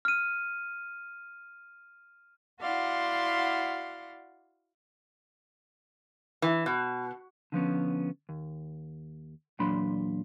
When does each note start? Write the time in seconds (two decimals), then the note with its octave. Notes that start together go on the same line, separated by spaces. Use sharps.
0.05 F6 D#7
2.60 E4 F#4 D5 F5 F#5 C6
6.42 E3
6.66 B2
7.52 D3 F3 B3 C#4
8.29 D#2
9.59 E2 A#2 F#3 D4 B5 C6